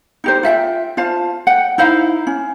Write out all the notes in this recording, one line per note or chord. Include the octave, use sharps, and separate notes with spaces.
D#4 G4 C5
F4 E5 F#5 G5
F4 C5 F5 A5
F#5 G5
D#4 E4 C5 F5
C#4